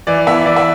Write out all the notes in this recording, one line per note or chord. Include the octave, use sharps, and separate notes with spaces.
E3 D5
B3 E4 E5
E3 D5
E5